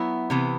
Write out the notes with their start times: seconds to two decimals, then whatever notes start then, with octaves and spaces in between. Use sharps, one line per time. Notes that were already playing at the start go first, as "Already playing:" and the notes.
Already playing: F#3 B3 E4 E5
0.30 C3 E3 B3